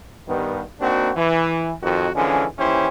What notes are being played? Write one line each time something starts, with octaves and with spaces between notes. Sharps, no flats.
G2 D#3 B3
A#3 C4 D4 D#4 F#4
E3
F2 D#3 F#4
D3 E3 F3 G#3 C#4
D#2 E3 C#4 E4 G4 C5